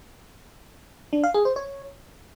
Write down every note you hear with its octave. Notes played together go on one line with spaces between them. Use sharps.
D4
F5
G#4
C5
C#5